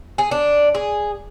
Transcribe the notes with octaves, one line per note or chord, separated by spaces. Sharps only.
G#4
D4
G#4